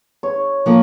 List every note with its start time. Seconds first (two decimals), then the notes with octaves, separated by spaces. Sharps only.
0.23 C#5
0.66 F3 A#3